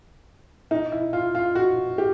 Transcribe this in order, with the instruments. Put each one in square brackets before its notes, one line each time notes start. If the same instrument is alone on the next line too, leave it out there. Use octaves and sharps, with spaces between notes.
[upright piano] D#4
E4
F4
F4
F#4
G4